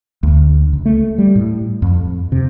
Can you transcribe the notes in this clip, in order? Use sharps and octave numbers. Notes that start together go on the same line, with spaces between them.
D2
C#2
A3
G3
A2
F2
C3